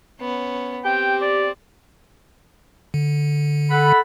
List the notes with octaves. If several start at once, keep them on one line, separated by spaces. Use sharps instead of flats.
B3 C#4
C4 G4 G5
D5
D3
A4 F#5 B5